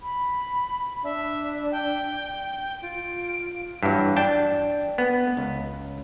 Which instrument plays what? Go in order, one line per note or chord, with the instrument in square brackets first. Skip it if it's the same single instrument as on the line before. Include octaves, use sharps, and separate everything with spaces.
[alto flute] B5
[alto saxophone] D4 [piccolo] E5
[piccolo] G5
[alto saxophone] F4 [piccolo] D7
[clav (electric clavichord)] G2 E3 F#3
D4 G5 A5
B3
C#2